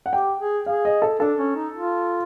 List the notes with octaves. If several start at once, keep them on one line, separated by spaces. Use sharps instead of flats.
F#5
G4 G5
G#4
G#4 F5
D#5
A4
D4 A4
C#4
D#4
F4